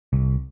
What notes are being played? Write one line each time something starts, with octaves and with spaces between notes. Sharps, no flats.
C2